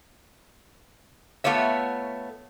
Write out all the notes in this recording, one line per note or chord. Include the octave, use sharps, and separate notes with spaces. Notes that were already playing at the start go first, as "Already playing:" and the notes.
A3 B3 F4 C#5 E5